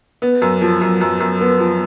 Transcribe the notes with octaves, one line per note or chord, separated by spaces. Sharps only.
B3
F#2
F3
F#2
F#2
F#2
B3
F3